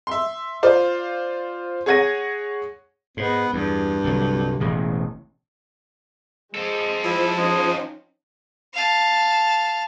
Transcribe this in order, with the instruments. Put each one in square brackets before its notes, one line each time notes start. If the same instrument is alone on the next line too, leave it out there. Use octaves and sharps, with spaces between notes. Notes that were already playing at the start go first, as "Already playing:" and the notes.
[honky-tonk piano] E5 C6
F4 C5 D5 F5
G#4 C#5 F#5 G#6 A#6 D#7
[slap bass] G#2 [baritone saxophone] B3
[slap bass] E2 [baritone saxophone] G2
[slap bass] C2 D3 F#3
E1 A1 C#3
[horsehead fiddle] G#3 [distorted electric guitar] C4 A4
[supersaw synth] F3 [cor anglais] E4
[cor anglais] G#3 [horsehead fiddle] C#4 D#4
[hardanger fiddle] F5 A5